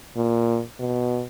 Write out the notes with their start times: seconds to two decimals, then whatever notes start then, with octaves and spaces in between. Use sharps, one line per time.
0.16 A#2
0.80 B2